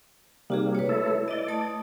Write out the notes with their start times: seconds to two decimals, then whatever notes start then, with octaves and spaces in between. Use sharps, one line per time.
0.50 C3 G3 A#3 D#4 F#4 G#4
0.75 B4 C#5
0.89 A3 E4 A4
1.28 E4 D5 D#5
1.48 A3 A5 D#6